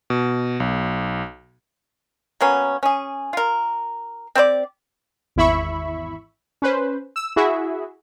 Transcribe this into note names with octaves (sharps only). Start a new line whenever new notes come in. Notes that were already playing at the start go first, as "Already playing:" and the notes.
B2
B1
F#3 A#3 B3 C#4
C#4 G#4
F4 A#4
C4 G4 C5 D5
G#1 E2 E4 E5 B5 C#6
C#4 B4 C5
E6
E4 F#4 G#4 E5